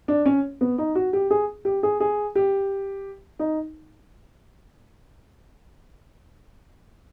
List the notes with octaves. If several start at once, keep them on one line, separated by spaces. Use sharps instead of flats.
D4
C#4
B3
D#4
F#4
G4
G#4
G4
G#4
G#4
G4
D#4